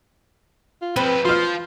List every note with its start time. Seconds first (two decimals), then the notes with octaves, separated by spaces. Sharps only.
0.82 F4
0.96 F3 B3 C4 B4
1.25 F3 F4 C6 F6